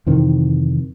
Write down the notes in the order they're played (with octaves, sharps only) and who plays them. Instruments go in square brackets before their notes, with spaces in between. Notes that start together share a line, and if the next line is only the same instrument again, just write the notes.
[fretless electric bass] F2 C3 D#3 E3